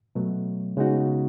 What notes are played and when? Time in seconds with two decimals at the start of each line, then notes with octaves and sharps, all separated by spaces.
0.15 B2 F#3 A3
0.77 C#3 G#3 B3 D#4 F#4